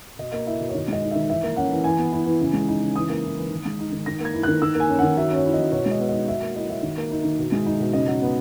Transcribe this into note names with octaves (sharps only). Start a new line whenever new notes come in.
B2 D#5
A#3 D#5
E4 E5
B2 D#5
C#5
D#3 D#5
G#3 D#5
D#4
D#3 E5
E3 E5
A#3
C#4 F#5
E3
E3 G#5
B3
E4
E3
C#3
G#3
D#4
C#3
E3 D#6
A#3
E4
E3
D#3
G#3
D#4
D#3
D#3 A#6
A#3 G#6
E4
D#3 F#6
D#3 E6
A#3
G#5
C#4
D#3 F#5
F#3 E5
C#4
C#5
E4
F#3 D#5
B2 C#5
G#3
D#5
B3
D#4 D#5
F#3 E5
A#3
E4 D#5
F#3 E5
D#3
A#3
D#4
D#3
B2
G#3
D#4
B2
C#3 D#5
F#3
B3